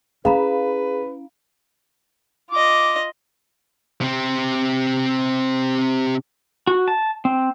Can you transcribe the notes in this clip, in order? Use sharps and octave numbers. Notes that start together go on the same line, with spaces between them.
C#4 E4 G#4 B4 F5 A#5 B5
F4 D#5 D6
C3 C4
F#4
A5
C4